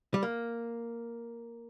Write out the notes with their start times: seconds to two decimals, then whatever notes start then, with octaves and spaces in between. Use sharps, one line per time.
0.14 G3
0.23 A#3